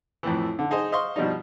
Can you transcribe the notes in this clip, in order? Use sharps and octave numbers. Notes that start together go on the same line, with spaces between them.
F2 A2 E3
D3
D#4 G#4 C5 D#5
C5 D#5 F5 C6 C#6
B2 F3 G3 D4 D#4